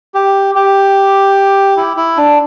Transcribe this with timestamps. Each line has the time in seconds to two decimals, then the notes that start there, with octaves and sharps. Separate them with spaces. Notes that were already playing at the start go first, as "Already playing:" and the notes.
0.14 G4
0.55 G4
1.77 E4
1.97 E4
2.17 D4